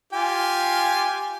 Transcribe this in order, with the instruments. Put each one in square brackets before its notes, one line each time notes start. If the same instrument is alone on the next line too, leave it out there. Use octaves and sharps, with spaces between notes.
[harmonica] F4 G4 G#5